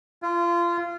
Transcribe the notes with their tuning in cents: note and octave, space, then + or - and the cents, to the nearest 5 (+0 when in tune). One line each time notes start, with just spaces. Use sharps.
F4 -25